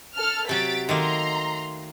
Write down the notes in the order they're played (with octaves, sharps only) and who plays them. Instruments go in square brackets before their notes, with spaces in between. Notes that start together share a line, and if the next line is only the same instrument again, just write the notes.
[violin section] A4 F6
[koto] C3 F#3 [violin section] A6 B6 D7
[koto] D#3 A3 A#3 [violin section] A#5 C6